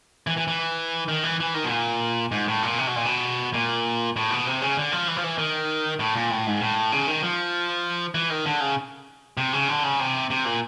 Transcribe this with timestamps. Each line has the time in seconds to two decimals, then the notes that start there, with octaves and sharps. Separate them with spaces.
0.27 E3
0.37 E3
0.48 E3
1.08 D#3
1.23 E3
1.40 E3
1.54 D#3
1.64 B2
1.70 A#2
2.31 G#2
2.47 A2
2.63 A#2
2.78 C3
2.87 B2
2.96 A#2
3.05 B2
3.54 A#2
4.16 A2
4.30 B2
4.47 C3
4.62 C#3
4.77 D3
4.92 F3
5.08 E3
5.16 F3
5.24 E3
5.38 D#3
6.00 A2
6.15 A#2
6.30 A2
6.47 G#2
6.61 A2
6.92 C#3
7.07 D#3
7.22 F3
8.15 E3
8.30 D#3
8.46 D3
8.60 C#3
9.37 C3
9.53 C#3
9.69 D3
9.83 C#3
9.99 C3
10.30 C3
10.45 A#2